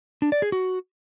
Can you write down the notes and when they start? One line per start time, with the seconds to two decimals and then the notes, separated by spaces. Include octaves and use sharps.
0.22 D4
0.32 D5
0.42 G#4
0.52 F#4